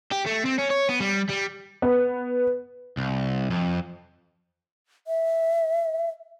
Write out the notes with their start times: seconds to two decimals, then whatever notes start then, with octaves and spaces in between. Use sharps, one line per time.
0.12 G4
0.26 A3
0.46 C4
0.59 C#4
0.71 C#5
0.89 B3
1.00 G3
1.29 G3
1.82 B3
2.97 C2
3.50 F2
5.07 E5